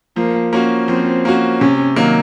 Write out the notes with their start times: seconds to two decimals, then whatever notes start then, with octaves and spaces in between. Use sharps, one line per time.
0.16 F3 A#3
0.53 A#3 C#4 F#4
0.88 F3 C4
1.25 A#3 C#4 F#4
1.60 C3 C#4
1.96 D#3 F#3 A#3